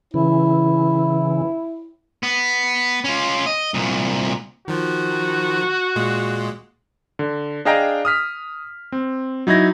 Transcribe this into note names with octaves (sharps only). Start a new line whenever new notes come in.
C#3 E3 E4
B3
C#4 F4
D#5
C2 A#2
D#3 F3 F#4
A#2 G#3
D3
D4 G#4 D#5 F5 G5 A#5
D#6 F6 B6
C4
F#3 D#4 E4 G#6 A#6